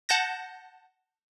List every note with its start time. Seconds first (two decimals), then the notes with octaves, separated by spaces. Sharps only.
0.09 F#5 A5 G6 A#6